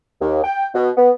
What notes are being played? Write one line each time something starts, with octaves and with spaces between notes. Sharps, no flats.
D#2
G5
B2
B3